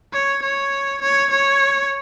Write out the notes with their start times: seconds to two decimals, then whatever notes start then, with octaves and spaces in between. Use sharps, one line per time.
0.13 C#5
0.43 C#5
1.02 C#5
1.31 C#5